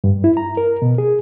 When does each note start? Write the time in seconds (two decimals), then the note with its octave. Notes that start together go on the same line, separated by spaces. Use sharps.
0.04 G2
0.24 E4
0.37 A#5
0.57 A#4
0.82 B2
0.98 G#4